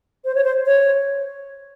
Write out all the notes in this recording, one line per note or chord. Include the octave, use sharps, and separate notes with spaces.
C5
C#5
C5
C#5